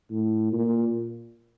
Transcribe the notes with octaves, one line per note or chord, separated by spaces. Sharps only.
A2
A#2